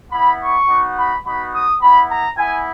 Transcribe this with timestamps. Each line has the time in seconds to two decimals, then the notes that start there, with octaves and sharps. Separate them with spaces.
0.12 B3 E4 B5
0.39 C#6
0.68 B3 D#4 F#4
0.96 B5
1.24 B3 D#4 F#4 B5
1.52 D#6
1.80 B3 E4 B5
2.08 A#5
2.36 B3 E4 G#5